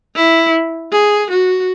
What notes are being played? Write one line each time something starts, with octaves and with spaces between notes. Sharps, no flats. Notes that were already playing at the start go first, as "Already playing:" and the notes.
E4
G#4
F#4